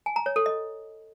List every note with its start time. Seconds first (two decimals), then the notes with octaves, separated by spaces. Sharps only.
0.06 G#5
0.16 A#5
0.26 C#5
0.36 A4
0.46 D#5